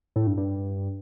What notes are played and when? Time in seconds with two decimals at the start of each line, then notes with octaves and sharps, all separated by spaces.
0.16 A2
0.27 G2
0.37 G2